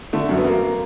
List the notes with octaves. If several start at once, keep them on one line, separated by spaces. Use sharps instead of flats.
D3 A3
F#2
B3
F#3 A#3